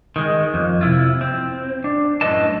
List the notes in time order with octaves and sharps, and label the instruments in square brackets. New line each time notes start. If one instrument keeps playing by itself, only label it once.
[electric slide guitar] D#3 G#3
F2
C3 E4 F4
C4
D4
F#2 A2 A3 B4 D#5 A5